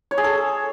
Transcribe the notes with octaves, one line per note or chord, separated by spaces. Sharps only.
C#5
G#4
A4